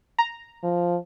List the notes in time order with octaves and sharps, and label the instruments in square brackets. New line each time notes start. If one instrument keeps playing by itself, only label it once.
[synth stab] A#5
[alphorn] F3